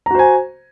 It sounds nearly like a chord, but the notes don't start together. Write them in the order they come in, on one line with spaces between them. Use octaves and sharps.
A#5 F#4 C5 G#5